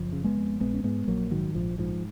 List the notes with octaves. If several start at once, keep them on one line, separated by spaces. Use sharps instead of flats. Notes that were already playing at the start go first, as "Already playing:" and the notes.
Already playing: F#1 F3
C#3
G#3 B3
F2
A#1 G#3 B3
C#4
G#2 G#3 B3
A#1 F#3 A#3
G#2 D#3 F#3
A#1 F3
G#2 F3